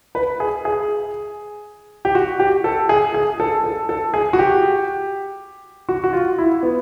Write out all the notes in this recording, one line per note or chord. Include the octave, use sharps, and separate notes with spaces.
B4
G#4
G#4
G4
F#4
G4
A4
G#4
G#4
A4
A4
A4
G#4
F#4
G4
F#4
F#4
F4
E4
B3